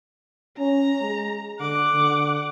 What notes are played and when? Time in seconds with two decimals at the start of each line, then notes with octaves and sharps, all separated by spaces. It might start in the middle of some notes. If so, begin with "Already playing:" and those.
0.58 C#4 A#5
1.01 G#3
1.60 D3 F#5 D6
1.94 D3